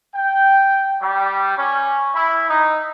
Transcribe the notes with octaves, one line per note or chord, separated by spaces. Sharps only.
G5
G3
C#4
E4
D#4